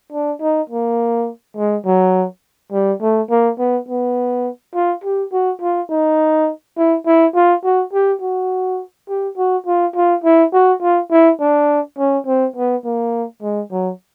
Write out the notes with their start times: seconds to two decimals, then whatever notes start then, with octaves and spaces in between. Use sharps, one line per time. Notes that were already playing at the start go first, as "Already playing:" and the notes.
0.12 D4
0.41 D#4
0.70 A#3
1.57 G#3
1.85 F#3
2.72 G3
3.01 A3
3.30 A#3
3.59 B3
3.88 B3
4.75 F4
5.04 G4
5.32 F#4
5.61 F4
5.90 D#4
6.77 E4
7.06 E4
7.35 F4
7.64 F#4
7.93 G4
8.22 F#4
9.08 G4
9.37 F#4
9.66 F4
9.96 F4
10.24 E4
10.53 F#4
10.82 F4
11.11 E4
11.40 D4
11.98 C#4
12.27 C4
12.56 B3
12.85 A#3
13.42 G#3
13.72 F#3